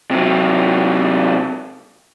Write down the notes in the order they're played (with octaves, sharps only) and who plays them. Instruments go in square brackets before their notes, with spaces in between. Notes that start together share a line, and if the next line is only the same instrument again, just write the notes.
[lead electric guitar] C3 F#3